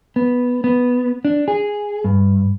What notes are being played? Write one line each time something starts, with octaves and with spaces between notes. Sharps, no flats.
B3
B3
D4
G#4
G2